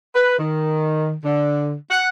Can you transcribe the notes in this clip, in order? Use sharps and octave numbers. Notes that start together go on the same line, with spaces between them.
B4
D#3
D3
F#5